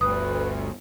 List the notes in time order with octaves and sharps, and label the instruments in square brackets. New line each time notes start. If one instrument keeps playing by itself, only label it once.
[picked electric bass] G1 [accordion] D2 [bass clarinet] B4 [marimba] D#6